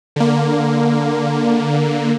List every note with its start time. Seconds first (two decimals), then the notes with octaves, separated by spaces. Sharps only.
0.16 D3 A#3